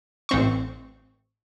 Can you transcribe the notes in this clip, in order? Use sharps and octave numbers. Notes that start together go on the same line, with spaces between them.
A1 C4 C#6